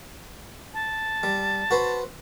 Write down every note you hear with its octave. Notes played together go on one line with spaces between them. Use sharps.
A5
G3
F#4 B4 C5